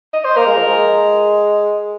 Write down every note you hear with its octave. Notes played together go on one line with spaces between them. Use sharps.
D#5
C5
A#3 A#4
G#3
F3
G#3